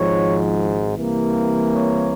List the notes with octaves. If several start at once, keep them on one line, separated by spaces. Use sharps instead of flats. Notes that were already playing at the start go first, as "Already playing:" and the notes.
Already playing: G#1 G#2 F3 C#5
C2 C3 E3 A#3
C#5